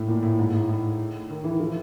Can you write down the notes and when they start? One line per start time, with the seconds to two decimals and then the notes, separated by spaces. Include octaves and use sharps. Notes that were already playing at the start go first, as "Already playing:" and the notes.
Already playing: A2
0.08 A#2
0.23 A2
0.39 G#2
0.53 A2
0.69 A2
1.30 D#3
1.44 E3
1.60 F3